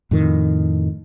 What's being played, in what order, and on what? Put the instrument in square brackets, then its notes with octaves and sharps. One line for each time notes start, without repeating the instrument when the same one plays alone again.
[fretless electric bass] F2 A2 D#3